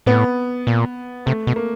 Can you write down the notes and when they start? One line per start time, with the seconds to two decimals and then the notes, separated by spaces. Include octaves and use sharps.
0.06 A2 B3
0.67 A#2
1.26 C3 A3
1.47 B2
1.56 A#3